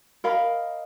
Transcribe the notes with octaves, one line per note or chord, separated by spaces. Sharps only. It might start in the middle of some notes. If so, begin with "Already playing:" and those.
A#4 D#5 F5 B5